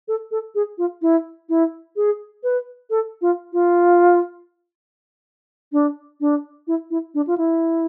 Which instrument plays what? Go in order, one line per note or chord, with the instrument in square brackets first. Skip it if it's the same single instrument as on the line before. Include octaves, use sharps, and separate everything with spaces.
[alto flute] A4
A4
G#4
F4
E4
E4
G#4
B4
A4
F4
F4
D4
D4
E4
E4
D4
F4
E4